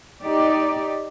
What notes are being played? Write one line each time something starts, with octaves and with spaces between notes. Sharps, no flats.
D#4 G4 D5